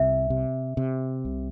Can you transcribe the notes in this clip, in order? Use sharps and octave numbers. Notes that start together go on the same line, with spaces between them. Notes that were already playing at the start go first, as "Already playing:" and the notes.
Already playing: C2 C3 E5
C3
C3
C2